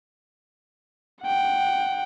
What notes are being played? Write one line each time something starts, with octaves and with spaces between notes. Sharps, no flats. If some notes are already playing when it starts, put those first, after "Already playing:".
F#5 G5